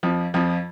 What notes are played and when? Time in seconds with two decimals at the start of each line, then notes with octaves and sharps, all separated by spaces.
0.03 F2 F3
0.34 F2 F3